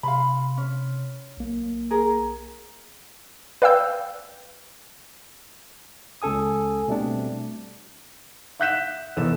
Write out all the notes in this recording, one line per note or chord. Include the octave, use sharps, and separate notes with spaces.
C3 F5 B5 C6
C#4
B1 A#3
G#4 A#4
B4 D5 F5 G5 E6 G6
C#2 C#4 A4 G#5 D#6
B2 G3 A3 C4 D4
E5 F#5 F#6 G6 B6 E7
E1 E2 A4 E7